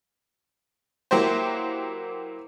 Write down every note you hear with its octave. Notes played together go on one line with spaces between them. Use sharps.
F#3 A#3 E4 G4 C5